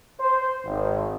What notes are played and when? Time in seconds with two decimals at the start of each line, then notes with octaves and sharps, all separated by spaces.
0.20 C5
0.65 G#1